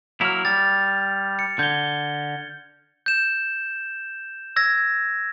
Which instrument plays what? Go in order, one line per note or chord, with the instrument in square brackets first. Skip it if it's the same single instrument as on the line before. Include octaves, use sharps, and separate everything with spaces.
[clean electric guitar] F#3 A#3 E4 [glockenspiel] F6 F7
[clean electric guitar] G3 [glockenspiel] A6
[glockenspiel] C#7
[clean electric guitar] D3 [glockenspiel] G6 G#6 G7
[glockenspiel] G6 E7
E6 G#6 A#6